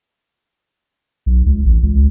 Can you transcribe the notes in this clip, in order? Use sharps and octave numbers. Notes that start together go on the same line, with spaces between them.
B1
C#2
A1
C#2